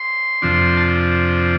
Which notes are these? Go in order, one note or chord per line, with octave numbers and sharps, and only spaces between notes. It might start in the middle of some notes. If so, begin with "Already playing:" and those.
Already playing: C6
F2 C3 F3 D4
A5